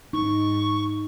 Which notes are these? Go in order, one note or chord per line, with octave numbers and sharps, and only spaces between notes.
G#2 D#4 C#6